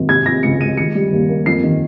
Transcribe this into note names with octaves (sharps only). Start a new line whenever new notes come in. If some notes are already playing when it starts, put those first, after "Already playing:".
Already playing: G#1
C3 G#6
F3 A#6
C#2 C#7
G#3 D#7
D#3 C#7
G3
D#2
A#3
F2 C7
D#3